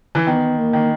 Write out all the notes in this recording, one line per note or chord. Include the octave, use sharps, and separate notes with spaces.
E3
D#3 B3
A#3
D#3